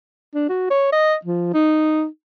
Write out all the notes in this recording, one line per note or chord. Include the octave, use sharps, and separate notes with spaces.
D4
F#4
C#5
D#5
F3
D#4